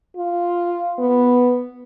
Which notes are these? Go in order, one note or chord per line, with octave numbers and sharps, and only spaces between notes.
F4
B3